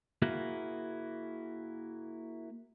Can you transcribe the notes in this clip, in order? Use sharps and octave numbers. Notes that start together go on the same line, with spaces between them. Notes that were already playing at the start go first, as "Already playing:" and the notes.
A#3 E4 F#4 G#4